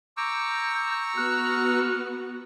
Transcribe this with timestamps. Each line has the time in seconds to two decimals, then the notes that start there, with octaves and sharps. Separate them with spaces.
0.17 A#5 C#6 D6 E6 G6
1.17 B3 F#4 F6 F#6